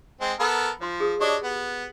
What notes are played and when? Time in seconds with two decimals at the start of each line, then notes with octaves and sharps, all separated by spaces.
0.21 G#3 C4
0.40 B3 A4 A#4 B5
0.81 F3 C5 C6
1.00 G#4 D#6
1.21 D4 F#4 G4 C#5 D#5
1.43 B3